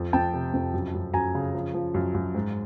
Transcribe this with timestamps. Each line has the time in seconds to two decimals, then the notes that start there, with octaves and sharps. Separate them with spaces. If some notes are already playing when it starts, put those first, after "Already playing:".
Already playing: F2
0.13 F2 G5 A5
0.34 C3
0.53 F2
0.74 F#2
0.94 F#2
1.13 F#2 G#5 A#5
1.35 C#3
1.55 F3
1.74 F3
1.94 F#2
2.15 F#2
2.35 G#2